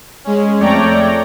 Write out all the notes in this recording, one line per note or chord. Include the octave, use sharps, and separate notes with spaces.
G#3 C#4
F2 A3 C#5 D5 G5 A#5